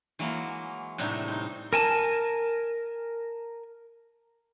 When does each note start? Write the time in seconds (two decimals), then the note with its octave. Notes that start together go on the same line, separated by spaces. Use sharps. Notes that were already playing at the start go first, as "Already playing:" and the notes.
0.19 E3 F#3 G#3 A#3
0.98 A2 C3 G3 D4 D#4 G#5
1.28 C4 D#4
1.73 A#4 G#5 A5